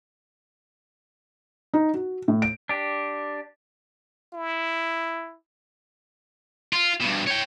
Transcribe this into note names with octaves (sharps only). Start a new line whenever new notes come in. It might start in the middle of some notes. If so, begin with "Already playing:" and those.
D#4
F#4
A2
D7
D4 G4
E4
F4
G2 B2
C#5 G5